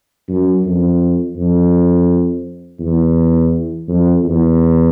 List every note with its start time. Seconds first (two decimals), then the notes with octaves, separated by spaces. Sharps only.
0.29 F#2
0.65 F2
1.36 F2
2.79 E2
3.88 F2
4.24 E2